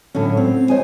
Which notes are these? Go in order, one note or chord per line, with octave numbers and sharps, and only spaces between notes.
A2 D3 F#3 C#4
C4 C#5
C5 C#5 D#5 G#5